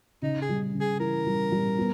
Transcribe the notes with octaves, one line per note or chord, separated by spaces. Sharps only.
C#3 D#4
G#4
G3
C#3
G#4
E3 A#4
G3
G3
B3